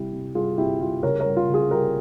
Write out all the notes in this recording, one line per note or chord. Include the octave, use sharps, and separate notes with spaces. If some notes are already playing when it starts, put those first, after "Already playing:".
Already playing: C3 G3 E4 G4
C3
G3 F4 G#4
C3 E4 G4
G3 F4
C#3 A#4 C#5
A#4 C#5
G3
F4
C#3
F4 G#4
G3 G4 A#4